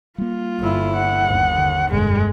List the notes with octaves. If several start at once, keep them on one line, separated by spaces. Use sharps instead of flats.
G3 A#3 F4
G1 E4
F#5
G1 D#2
D3
G1 F2 B2 G#3